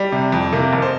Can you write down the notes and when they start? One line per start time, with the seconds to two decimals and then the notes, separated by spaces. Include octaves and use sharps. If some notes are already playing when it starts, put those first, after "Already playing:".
Already playing: G3
0.12 C3
0.32 F2
0.53 C3 A#3
0.73 F1
0.82 C5